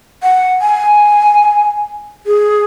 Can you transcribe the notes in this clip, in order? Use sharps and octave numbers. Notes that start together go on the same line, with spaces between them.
F#5
G#5
G#4